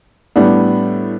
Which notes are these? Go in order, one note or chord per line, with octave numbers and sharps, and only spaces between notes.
A2 G3 B3 D4